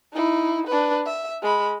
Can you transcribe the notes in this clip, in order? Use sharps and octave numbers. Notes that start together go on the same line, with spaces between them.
D#4 E4
D4 B4
E5
G#3 B5